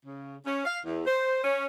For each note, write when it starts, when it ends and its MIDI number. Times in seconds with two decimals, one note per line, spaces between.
0.04 0.36 49
0.45 0.61 61
0.65 0.78 77
0.84 1.01 40
1.06 1.39 72
1.43 1.66 61